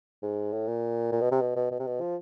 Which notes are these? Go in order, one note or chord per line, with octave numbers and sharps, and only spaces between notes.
G#2
A2
A#2
A#2
B2
C3
B2
B2
B2
C3
B2
F3